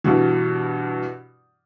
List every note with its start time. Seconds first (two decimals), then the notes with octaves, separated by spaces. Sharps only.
0.04 G2 B2 E3